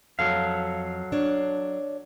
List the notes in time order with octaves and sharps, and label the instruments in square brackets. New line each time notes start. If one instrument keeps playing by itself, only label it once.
[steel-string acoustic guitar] F2 [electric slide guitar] F#3 A4 F5
[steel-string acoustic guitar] D4 C#5